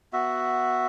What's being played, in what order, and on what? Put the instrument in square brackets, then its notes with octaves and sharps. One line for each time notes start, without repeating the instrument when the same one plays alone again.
[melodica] B3 F#4 E5